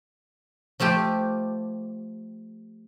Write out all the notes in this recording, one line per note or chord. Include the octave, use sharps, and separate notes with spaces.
F3 A3 F4 G4